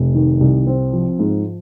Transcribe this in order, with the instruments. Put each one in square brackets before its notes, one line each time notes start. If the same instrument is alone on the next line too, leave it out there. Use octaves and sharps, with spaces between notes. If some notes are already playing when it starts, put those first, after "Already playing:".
Already playing: [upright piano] F1
D#3
C2
C4
F3
G#2